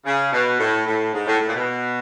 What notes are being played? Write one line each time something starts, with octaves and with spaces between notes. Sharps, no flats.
C#3
B2
A2
A2
G#2
A2
A2
A#2
B2